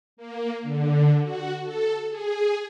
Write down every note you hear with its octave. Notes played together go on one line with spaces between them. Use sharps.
A#3
D3
F#4
A4
G#4